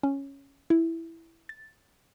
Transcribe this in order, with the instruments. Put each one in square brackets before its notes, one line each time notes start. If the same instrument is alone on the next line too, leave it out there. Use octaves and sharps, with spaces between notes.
[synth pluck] C#4
E4
A6